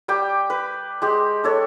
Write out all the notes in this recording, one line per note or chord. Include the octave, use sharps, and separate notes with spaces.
G3 G4 G5 D6
B4
G#3 G4
D4 A4 C#5